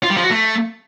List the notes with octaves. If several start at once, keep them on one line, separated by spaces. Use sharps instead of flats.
F4
G3
F3
F#4
A3